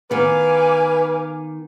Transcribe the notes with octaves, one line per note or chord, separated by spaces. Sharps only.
D#3 B3 B4 F5 G#5 D6